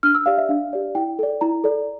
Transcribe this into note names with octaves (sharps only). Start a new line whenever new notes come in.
D4 F6
E6
G4 D5 F5
E5
D4 F5
G4 D5
E4 G5
A4 D5
E4 A#5
A4 D5